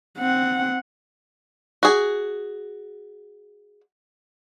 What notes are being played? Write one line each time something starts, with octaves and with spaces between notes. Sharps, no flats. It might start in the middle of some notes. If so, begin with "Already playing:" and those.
C4 F#5
F#4 G#4